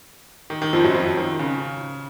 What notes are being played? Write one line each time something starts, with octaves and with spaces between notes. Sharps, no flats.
D#3
D#3
F2 F3
F#2 F#3
F2 F3
D#3
C#3